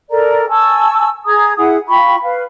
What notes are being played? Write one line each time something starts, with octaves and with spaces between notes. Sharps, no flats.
A4 A#4 D5 A#5
G#5 A5 C#6 E6
G#4 A#5 D#6 G#6
E4 G#4 F#5 D#6
F4 G5 B5 C#6
B4 F5